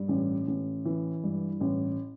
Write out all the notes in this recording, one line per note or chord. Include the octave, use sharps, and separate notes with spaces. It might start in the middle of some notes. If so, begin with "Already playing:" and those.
Already playing: G2
A1
A1
E3
G2
A1